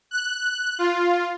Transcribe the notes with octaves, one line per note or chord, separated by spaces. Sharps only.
F#6
F4